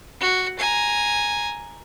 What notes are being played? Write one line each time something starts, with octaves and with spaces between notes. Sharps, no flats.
F#4
G#5 A#5